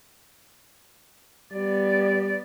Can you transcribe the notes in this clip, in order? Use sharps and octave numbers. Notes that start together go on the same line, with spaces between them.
G3 B3 D5